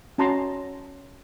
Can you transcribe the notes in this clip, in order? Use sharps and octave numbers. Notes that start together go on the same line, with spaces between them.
C#4 F#4 A5 A#5 C6